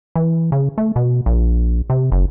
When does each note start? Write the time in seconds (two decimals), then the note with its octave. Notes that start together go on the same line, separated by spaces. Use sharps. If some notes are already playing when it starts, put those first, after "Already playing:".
0.16 E3
0.52 C#3
0.78 A3
0.96 B2
1.26 A#1
1.90 C3
2.12 F#1